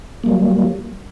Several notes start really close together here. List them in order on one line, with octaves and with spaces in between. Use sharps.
A#3 G3 F#3